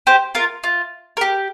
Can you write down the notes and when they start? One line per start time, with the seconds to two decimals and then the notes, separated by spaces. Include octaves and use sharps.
0.07 G4 C5
0.35 F4 A#4
0.64 F4
1.17 A#4
1.21 G4